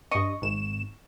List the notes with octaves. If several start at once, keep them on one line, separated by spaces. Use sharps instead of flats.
G2 D#5 C#6
G#1 E7